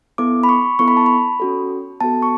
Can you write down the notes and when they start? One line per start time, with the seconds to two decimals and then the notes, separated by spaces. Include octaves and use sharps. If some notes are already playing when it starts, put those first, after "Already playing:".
0.18 B3 E4 A4 D6
0.43 B5
0.49 C#6
0.79 B3 E4 A4 C#6
0.88 B5
0.97 A5
1.06 B5
1.40 C#4 F#4 A4
2.00 B3 F#4 A4 A5
2.22 C#6